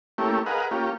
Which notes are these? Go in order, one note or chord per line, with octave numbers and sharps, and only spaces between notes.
A3 A#3 C#4 E4 G4
G#4 A#4 B4 D#5 F5 F#5
A#3 C#4 F4 G4